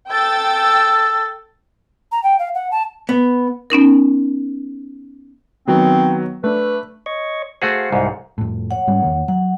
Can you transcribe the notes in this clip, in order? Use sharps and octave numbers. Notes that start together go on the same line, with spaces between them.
A4 G5 E6 A6
A#5
G5
F5
F#5
A5
B3
B3 C#4 D#4 A#4
D#3 F#3 B3 C4
A3 D4 B4
C#5 D#5 C#6
A3 F#4 G#4 C5 F5 F#5
C2 G#2
F2 A2
C#5 F#5
G#2 G3 C#4
E2 D#3 A#3
F#3 F#5